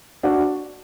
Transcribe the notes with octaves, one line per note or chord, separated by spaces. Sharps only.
D4 F#4